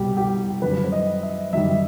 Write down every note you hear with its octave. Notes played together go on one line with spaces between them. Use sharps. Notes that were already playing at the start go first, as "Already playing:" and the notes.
Already playing: C2 B2 G3 G4
G4
F#2 D#3 G3 B4
C5
D#5
E5
F#2 D#3 G3 E5